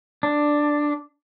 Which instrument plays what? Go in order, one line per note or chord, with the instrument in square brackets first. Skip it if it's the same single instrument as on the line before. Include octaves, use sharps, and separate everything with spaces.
[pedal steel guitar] D4